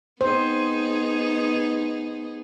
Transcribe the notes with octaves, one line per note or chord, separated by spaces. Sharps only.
B3 D#4 G#4 C5